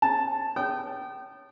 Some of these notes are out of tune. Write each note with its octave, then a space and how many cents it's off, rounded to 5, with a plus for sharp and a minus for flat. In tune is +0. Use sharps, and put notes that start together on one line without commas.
C#4 -30 A5 +0
C#5 +10 G5 -25 D#6 -35